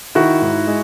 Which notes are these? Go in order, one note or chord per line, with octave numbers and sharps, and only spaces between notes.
D#3 E4 F#4
G#2
G#3